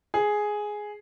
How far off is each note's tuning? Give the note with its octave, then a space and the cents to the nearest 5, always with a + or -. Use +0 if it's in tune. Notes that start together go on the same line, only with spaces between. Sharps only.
G#4 +5